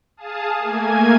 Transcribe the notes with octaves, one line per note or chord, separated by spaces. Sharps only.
G#4 F5 A5 D#6
A3 A#3 G#5 G#6